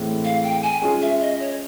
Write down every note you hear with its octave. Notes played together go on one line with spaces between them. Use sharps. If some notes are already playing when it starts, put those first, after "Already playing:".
Already playing: A2 E3 G#3 C4 E4
F5
G5
G#5
G#3 C#4 F4 G#4
E5
D#5
C#5